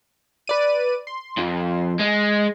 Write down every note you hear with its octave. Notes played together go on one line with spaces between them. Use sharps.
B4 D5 D#7
C6
F2
G#3